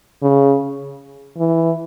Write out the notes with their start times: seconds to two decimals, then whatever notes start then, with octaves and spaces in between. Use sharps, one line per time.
0.22 C#3
1.37 E3